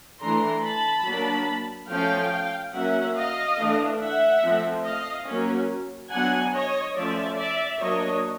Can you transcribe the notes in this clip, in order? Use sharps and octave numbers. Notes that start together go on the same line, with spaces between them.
E3 A3 D4 A#5 C6
A5 B5
F#3 A#3 D4
F3 A3 C#4 F5 G5
F#3 A#3 C#4 E5 F#5
D#5 F5
E3 A3 D4
E5 F#5
F3 A3 C4
D#5 F5
F#3 A#3 C#4
F#3 B3 D4 F#5 G#5
C#5 D#5
F3 A3 C#4 D5 E5
D5 E5
F#3 A#3 D4 C#5 D#5